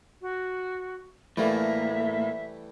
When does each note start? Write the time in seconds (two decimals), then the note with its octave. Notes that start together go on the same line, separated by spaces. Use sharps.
0.22 F#4
1.37 A2 E3 G3 A3 A#3 E5